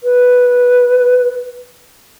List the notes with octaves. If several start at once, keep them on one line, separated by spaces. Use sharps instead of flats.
B4